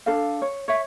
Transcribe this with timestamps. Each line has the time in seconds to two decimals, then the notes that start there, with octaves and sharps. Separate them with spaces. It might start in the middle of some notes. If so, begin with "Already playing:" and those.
0.06 D4 A4 F5
0.42 C#5
0.68 C#5 E5